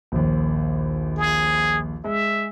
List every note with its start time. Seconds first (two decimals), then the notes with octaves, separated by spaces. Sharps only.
0.12 A#1 D#2
1.18 G#4
2.04 G#3 E5